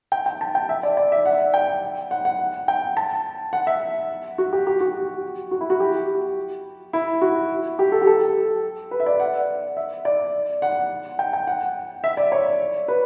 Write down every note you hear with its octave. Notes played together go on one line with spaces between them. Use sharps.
G5
G5
A5
G5
E5
D5
D5
E5
F#5
G5
F#5
F#5
G5
A5
F#5
E5
F#4
G4
G4
F#4
F#4
E4
F#4
G4
E4
F#4
G4
A4
G4
A4
B4
E5
D5
F#5
E5
D5
F#5
G5
G5
F#5
E5
D5
C#5
B4